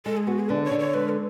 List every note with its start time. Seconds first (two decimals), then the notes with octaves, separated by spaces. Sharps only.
0.06 G#3 A4
0.17 G#4
0.27 B3 F#4
0.39 G#4
0.49 D3 B4
0.64 C#5
0.71 D3
0.79 C#5
0.94 G#3 B4
1.09 A4